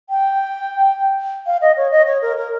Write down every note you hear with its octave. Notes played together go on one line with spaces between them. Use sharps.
G5
F5
D#5
C#5
D#5
C#5
A#4
A#4